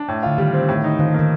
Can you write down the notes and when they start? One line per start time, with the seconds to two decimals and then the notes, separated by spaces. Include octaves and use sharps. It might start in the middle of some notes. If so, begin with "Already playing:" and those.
Already playing: D4
0.08 A2
0.23 D3 F4
0.38 D#3 G3
0.54 C4
0.68 A2
0.84 D#4
0.99 D#3 F3
1.14 D#3 A#3